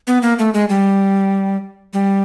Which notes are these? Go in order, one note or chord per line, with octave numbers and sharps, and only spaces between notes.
B3
A#3
A3
G#3
G3
G3